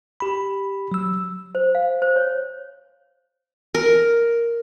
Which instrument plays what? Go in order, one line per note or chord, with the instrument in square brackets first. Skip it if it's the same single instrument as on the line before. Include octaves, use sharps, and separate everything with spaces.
[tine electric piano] G4 B5
F#3 E6
[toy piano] C5
F5
C5
C#5
[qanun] A#4